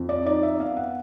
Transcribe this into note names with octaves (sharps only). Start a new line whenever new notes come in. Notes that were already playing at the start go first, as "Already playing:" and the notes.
Already playing: F2
D5
D#4 D5
E5
B3 F5
F#5